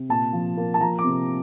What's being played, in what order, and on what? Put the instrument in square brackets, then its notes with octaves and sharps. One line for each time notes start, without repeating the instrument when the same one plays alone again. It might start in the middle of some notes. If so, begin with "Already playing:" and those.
Already playing: [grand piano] C3
A#2 A5
F3
A#3
A5
F3 A#5
D6
C3